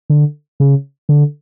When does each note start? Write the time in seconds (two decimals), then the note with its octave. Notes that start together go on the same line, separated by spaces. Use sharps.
0.10 D3
0.60 C#3
1.09 D3